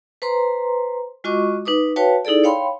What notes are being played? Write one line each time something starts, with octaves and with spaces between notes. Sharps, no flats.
B4 C5 A#5 C6
G#3 F4 F#4 D#5 C#6 D6
D#4 B4 D6 D#6
F#4 B4 C#5 F5 G5 A5
D#4 E4 G#4 A4 D5
C#5 F5 G5 B5 C6